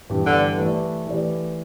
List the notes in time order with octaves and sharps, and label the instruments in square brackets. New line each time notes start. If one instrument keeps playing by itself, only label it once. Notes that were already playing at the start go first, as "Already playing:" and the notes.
[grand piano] G2 E3 B3 G4
[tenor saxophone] D3
[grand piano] E3 A3 G4 B4 D5
E3 A3 G4 B4 D5